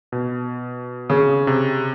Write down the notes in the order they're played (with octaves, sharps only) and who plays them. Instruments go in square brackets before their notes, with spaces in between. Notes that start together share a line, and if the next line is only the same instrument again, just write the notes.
[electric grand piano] B2
[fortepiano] C#3
[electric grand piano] C3